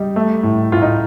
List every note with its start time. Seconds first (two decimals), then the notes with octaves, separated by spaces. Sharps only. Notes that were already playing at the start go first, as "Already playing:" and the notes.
Already playing: G3 D#4
0.16 A3
0.43 A2
0.72 A2 F4
0.82 D#4